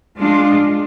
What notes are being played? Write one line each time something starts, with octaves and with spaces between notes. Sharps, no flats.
G#3 D4 F4